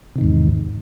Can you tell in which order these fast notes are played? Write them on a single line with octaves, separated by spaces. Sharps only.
C3 D#3 G#2 E2